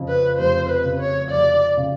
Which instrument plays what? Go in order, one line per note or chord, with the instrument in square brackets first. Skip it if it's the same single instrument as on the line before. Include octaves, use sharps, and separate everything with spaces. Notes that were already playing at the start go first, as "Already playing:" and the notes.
Already playing: [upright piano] F2 C#3
[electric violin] B4
[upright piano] F1 [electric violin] C5
[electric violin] B4
[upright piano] C#3
[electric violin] C#5
[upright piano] F1 [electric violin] D5
[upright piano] C#3